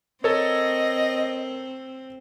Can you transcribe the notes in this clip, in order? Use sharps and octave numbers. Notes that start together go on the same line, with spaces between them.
C4 A4 A#4 C#5 D#5